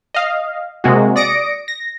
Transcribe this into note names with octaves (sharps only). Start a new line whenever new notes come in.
D#5 F5
C3 G#3 A#3 F#4
D5 D#6 A#6 C#7 D7
A#6